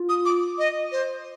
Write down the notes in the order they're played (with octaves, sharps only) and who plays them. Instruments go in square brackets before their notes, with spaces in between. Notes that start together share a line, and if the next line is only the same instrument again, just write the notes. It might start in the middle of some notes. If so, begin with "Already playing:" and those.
Already playing: [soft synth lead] F4
[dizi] D#6
D6
D#5
C5